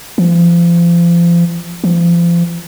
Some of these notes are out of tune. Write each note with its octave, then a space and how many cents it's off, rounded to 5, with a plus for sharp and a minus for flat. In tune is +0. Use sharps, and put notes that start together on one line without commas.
F3 -35
F3 -35